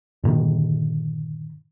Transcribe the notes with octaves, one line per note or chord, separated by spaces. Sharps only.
G2 A#2 D3 D#3